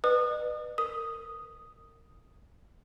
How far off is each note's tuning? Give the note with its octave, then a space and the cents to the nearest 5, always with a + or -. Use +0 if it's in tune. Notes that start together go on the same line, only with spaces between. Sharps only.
B4 +0 D#5 -45 D#6 -35
A#4 -30 D#6 +0